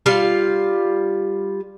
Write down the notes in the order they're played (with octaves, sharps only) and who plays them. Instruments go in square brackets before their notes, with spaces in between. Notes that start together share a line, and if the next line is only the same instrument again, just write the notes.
[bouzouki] G3 F4 F5